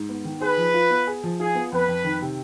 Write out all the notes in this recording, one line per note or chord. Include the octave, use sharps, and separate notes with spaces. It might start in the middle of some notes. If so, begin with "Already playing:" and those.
Already playing: G#2
B3
D#3
G#4 B4
F3
F4
B3
G#4
F3
F4 G#4
B3
F2 B4
F2
D#3
C3